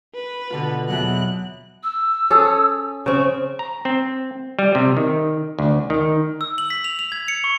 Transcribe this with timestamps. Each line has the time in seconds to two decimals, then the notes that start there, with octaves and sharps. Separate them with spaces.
0.14 B4
0.50 B2 D3 F4
0.89 E2 B2 F#3 F#6
1.84 E6
2.30 C#4 G#4 A4
3.06 C#3 C4 C#6
3.59 A#5
3.85 C4
4.59 G3
4.75 C3
4.97 D#3
5.59 D2
5.90 D#3
6.41 E6
6.58 F#7
6.70 B6
6.84 F7
6.99 F7
7.12 G#6
7.28 C#7
7.44 C#6